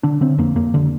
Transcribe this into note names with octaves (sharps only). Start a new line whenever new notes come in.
D3 D4
D3 C4
F2 A#3
F2 A#3
D3